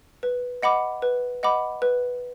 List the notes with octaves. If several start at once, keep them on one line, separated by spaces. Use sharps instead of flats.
B4
D#5 F#5 B5 D6
B4
D#5 F#5 B5 D6
B4